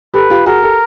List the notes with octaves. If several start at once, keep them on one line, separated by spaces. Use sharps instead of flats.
G4 A4 B4
F4 G4
F#4 G#4 A#4
G4 A4